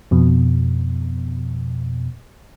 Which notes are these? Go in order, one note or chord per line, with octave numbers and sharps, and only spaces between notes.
F2 B2